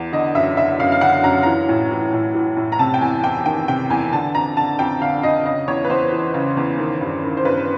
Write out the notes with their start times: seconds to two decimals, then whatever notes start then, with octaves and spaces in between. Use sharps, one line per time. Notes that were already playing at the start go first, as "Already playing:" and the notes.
Already playing: E2
0.12 D3 D#5
0.35 F#2 E5
0.57 D3 E5
0.79 F#2 F5
0.92 F5
1.01 D3 F#5
1.24 F#2 A#5
1.43 E3 A#5
1.69 A2
1.91 E3
2.13 A2
2.35 E3
2.57 A2
2.72 A#5
2.79 C3 A5
2.94 G5
3.01 E2 G#5
3.23 E2 G5
3.46 D#3 G5
3.68 C3 G5
3.90 E2 G#5
4.13 D3 A5
4.34 F2 A#5
4.57 D3 A5
4.79 F2 G5
5.00 D3 F5
5.23 F2 D#5
5.45 C#3 D#5
5.68 E2 C#5
5.85 B4
5.90 E2 C5
6.12 E3
6.34 C#3
6.57 E2
6.79 D#3
7.01 G2
7.23 D#3
7.37 C5
7.45 G2 B4